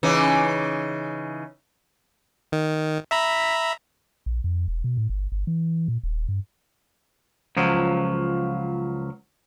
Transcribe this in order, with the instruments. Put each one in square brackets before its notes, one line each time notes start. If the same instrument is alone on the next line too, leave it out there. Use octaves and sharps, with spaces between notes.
[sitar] C#3 E3 D#4
[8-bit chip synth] D#3
E5 A#5 B5
[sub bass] A#1
F2
E1
B2
A2
G1
G1
E3
A#2
D#1
G2
[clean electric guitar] C#2 F3 F#3